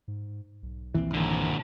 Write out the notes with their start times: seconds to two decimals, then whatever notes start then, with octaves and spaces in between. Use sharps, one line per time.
0.08 G#2
0.63 B1
0.94 D#2 A#2 E3 C4
1.14 G2 A#2 D3 D#3 A#3